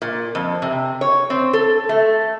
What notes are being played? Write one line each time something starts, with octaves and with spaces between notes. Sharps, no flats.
A#2
F2
C3
C#5
C4
A4
A3